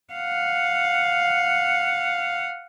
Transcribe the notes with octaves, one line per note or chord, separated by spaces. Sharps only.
F5 F#5